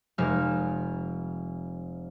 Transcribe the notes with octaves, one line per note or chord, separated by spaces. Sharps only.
F1 G#3 F6